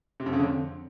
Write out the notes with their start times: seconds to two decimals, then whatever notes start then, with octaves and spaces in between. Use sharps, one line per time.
0.20 C3
0.26 F2
0.33 C#3
0.39 D3
0.46 F2